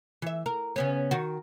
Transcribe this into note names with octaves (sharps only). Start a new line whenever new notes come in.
E3 E5
A#4
C#3 B3 C#4
D#3 F#4